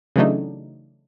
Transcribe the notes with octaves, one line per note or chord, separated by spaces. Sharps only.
C#3 E3 F#3 A3 D4 D#4